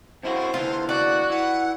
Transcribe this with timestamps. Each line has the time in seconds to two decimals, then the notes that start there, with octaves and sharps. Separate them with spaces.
0.23 F2 E4 F#4 C5
0.54 D2 E3 F4
0.89 F#4 D5 F#6
1.30 E3 F#5